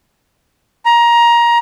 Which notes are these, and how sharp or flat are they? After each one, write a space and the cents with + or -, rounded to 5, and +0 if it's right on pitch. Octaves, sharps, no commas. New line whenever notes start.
A#5 +20